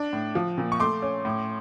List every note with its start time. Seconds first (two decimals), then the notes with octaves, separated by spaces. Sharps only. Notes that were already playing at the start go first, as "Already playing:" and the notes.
Already playing: D4
0.13 A2
0.35 F3
0.58 A#2
0.72 C#6
0.80 A3 C6 D6
1.02 C#4
1.25 A2